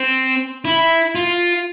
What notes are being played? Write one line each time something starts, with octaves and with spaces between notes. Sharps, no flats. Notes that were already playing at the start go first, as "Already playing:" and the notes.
Already playing: C4
E4
F4